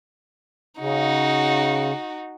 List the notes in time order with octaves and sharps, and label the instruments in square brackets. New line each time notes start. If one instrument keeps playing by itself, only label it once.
[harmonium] C#3 [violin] D#4 F#4